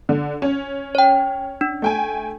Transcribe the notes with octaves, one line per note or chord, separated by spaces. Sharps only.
D3
C#4
C#5 G5
D4
A3 G5 G#5